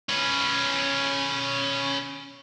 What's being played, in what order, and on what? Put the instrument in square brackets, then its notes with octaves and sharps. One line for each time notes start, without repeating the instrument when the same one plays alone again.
[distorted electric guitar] C#4 B4